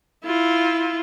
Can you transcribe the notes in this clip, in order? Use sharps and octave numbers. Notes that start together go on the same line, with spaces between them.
E4 F4